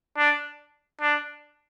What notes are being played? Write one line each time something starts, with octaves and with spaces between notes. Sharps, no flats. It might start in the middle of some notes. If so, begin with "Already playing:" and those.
D4
D4